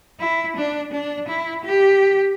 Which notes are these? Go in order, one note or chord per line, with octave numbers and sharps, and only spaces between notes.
E4
D4
D4
E4
G4